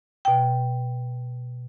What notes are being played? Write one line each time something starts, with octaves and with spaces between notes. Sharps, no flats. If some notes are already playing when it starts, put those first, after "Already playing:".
B2 G5